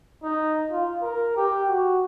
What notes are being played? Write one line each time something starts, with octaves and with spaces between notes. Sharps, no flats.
D#4
F4
A#4
G4
F#4